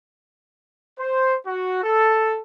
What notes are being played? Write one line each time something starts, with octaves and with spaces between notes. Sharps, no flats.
C5
F#4
A4